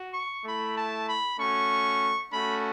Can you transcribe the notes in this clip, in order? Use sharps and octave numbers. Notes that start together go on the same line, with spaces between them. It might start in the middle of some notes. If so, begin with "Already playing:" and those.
Already playing: F#4
C#6
A3 E4 B5
A5
B5
A3 C#4 F#4 C#6
A3 C#4 F#4 B5